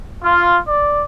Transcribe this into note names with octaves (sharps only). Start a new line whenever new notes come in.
F4
D5